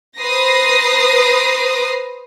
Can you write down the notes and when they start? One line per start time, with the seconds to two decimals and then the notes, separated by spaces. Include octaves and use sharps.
0.19 B4 C5 A#5 D#6 A#6 C7